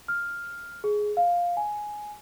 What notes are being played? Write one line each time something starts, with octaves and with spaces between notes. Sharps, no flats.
F6
G#4
F5
G#5